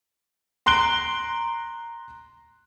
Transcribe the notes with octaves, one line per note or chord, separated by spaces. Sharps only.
A#5 C6 F#6 D7 G7